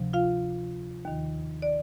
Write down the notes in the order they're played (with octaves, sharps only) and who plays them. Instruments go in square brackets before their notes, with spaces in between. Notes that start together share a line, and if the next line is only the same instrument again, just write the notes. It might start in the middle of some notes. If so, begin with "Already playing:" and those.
Already playing: [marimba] D2 C3 F3
F4 F5
D#2 D#3
D5